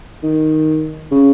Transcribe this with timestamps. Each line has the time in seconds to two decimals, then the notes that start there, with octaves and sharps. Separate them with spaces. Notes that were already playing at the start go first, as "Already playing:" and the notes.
0.23 D#3
1.11 C#3